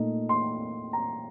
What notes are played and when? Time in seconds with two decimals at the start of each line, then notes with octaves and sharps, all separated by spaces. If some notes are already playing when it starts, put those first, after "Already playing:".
Already playing: A#2 A3 D#4
0.29 C6
0.93 A#5